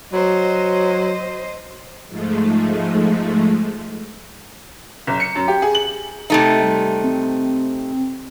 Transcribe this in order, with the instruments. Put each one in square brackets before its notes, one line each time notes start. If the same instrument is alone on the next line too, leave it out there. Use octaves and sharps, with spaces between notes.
[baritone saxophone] F#3 [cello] C5 D#5
[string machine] G#2 F3 G#3 A3
[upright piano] F#1
C#7
F#2
G4
G#4
F#7
[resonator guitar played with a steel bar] C3 A3 D#4 [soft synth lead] E5
[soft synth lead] G3
C4